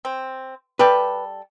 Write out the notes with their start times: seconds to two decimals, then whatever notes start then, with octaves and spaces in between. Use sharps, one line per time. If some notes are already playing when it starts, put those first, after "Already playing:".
0.05 C4
0.79 G3 G4 A4 B4